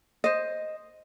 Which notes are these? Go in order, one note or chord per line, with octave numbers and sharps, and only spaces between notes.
C5 D#5